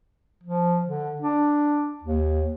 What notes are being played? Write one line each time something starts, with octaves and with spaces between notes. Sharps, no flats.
F3
D3
D4
D#2